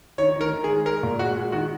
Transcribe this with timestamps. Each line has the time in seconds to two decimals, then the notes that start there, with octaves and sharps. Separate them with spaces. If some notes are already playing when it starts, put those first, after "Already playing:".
0.18 D#3 C#5
0.36 D#3
0.41 A#4
0.53 D#3
0.64 G#4
0.69 G#3
0.86 G#3 A#4
1.03 A#2
1.19 G#3 F#4
1.36 G#3
1.52 D#3 F#4